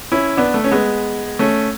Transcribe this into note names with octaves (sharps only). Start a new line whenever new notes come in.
C#4 E4
B3 D4
A3
C#4
G#3 B3
A3 C#4